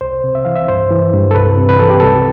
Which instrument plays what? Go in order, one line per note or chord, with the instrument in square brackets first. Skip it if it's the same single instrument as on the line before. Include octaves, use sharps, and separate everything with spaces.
[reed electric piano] C2 C5
C3
E5
E3 F5
E5
G2 C5
E3
G2
A4
C2 B4
C3
B4
E3 A4
G4
C2 A4